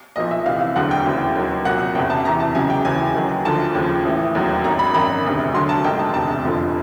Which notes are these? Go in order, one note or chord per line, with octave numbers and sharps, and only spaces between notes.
B1 A#2 F3 D#5
E5
C2 C3 E3 F5
F5
E1 D2 D3 F#3 F#5
G5
D#2 C#3 E3
D#2 D#3 F#3
C2 A#2 F#3 F#5
F#1 E2 C3 G5
A5
E2 C3 E3 A#5
A5
C#2 C#3 F#3 G#5
G5
D#2 C#3 E3 G#5
D#2 D#3 F#3
D2 D3 F3 A5
D#2 C#3 F3
A1 A2 E3
E1 D#2 D#3 F#3
G#1 F#2 D#3 A#5
B5
G#1 F#2 D#3 F#3 B5
E1 D2 C3
D2 D3 F#3 C6
A5
A#1 G#2 D#3 G5
A5
E1 D2 C3 A5
F1 F2 D3 F3